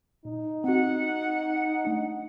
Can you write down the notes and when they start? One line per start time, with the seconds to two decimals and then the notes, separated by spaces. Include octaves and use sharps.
0.25 A#2 D#4
0.64 C4 F#4 F#5
1.85 A3 D4